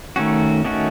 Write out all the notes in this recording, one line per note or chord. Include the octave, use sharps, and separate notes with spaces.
D#3 A3 C#4 F#4
D#3 A3 C#4 F#4